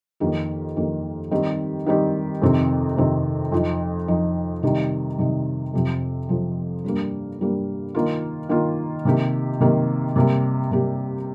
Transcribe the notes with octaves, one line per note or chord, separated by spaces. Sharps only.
F2 D#3 A#3 G4
F2 D#3 A#3 G4
D#3 G3 C4 D#4 G4
D#3 G3 C4 D#4 G4
F2 C3 D#3 C4
F2 C3 D#3 C4
F2 F3 D#4
F2 F3 D#4
C3 D#3 G3 D#4
C3 D#3 G3 D#4
F2 C3 F3
F2 C3 F3
G2 G3 A#3
G2 G3 A#3
D#3 A#3 F4
D#3 A#3 F4
C3 D#3 A#3 G4
C3 D#3 A#3 G4
C3 G3 A#3 G4
C3 G3 A#3 G4